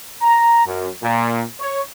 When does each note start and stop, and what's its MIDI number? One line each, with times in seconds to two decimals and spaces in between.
0.22 0.62 82
0.65 0.88 42
1.02 1.43 46
1.60 1.80 73